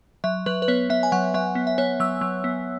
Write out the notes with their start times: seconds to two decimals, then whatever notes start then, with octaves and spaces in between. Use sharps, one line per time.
0.24 F#3 E5
0.46 F#3 B4
0.62 B4
0.68 B3 C#5
0.90 B3 E5
1.03 G#5
1.12 F#3 F#5
1.34 F#3 E5
1.55 B3
1.67 E5
1.78 B3 C#5
2.00 F#3 E6
2.21 F#3
2.44 B3